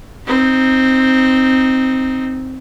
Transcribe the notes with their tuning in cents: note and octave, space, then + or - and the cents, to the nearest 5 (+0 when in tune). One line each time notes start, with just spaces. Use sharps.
C4 +0 D#4 +0